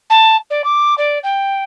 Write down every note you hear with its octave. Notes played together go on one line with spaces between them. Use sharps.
A5
D5
D6
D5
G5